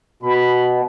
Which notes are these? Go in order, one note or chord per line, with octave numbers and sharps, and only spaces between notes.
B2 B5